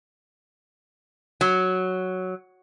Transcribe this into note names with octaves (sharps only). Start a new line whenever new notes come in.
F#3